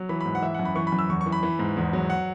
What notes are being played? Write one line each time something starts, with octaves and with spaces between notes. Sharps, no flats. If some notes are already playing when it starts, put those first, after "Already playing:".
Already playing: F#3
E3 B5
B5
G#2
F#5
E3 E5
F#2 F#5
B5
E3 C#6
B5
F#2
E6
E2 C#6
C#6
E3
B5
E3
G#2
E2
F#3
F#5